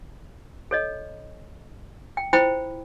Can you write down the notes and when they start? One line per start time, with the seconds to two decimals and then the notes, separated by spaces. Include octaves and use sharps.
0.71 A4 C#5 D#5
2.17 G5
2.33 E4 F4 C5 G5 B5